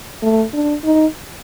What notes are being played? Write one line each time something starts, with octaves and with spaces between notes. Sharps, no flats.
A3
D4
D#4